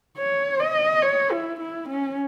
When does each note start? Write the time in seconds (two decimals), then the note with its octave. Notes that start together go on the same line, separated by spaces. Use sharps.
0.17 C#5
0.59 D#5
1.02 C#5
1.31 E4
1.60 E4
1.88 C#4